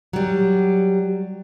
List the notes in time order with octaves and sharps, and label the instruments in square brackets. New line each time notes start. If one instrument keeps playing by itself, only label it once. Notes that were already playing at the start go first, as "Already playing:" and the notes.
[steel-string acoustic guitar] F#3 G3